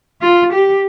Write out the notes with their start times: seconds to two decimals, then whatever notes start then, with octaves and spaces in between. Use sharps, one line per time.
0.22 F4
0.52 G4